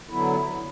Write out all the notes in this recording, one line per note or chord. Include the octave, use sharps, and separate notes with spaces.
D3 F#3 B3 E4